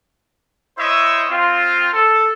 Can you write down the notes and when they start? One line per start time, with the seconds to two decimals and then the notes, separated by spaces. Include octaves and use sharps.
0.78 E4 C5 C#5 D#5 E5
1.30 C4 F4
1.93 A4